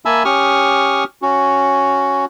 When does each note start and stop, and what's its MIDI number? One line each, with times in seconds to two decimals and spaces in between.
0.05 0.23 58
0.05 0.23 76
0.05 0.23 80
0.05 0.23 81
0.05 0.23 83
0.05 0.23 88
0.25 1.04 61
0.25 1.04 67
0.25 1.04 85
0.25 1.04 87
0.25 1.04 89
1.22 2.25 61
1.22 2.25 66